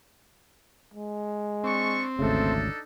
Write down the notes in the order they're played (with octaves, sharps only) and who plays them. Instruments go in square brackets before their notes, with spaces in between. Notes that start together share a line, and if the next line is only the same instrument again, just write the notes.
[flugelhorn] G#3
[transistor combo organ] C4 [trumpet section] D4 C#6
[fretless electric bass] G#1 D2 C#3 [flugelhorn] A3 [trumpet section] D4 D#4 A4